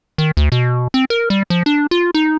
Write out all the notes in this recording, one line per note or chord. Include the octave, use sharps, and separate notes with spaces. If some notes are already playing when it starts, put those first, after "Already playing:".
D#3
D2
B2
C4
A#4
G3
F3
D4
F4
D#4